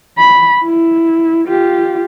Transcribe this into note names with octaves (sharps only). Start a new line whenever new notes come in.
B5
E4
F4 G4